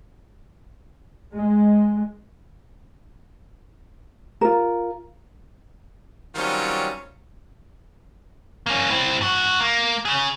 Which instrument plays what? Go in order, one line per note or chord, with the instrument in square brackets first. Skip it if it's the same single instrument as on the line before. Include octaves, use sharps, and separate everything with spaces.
[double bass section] G#3
[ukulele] F4 A#4
[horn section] D#3 F#3 G3 C4 C#4 F4
[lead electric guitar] A#3 C#4
C4 E4
G#2 F#4
A#3
C#3 G#4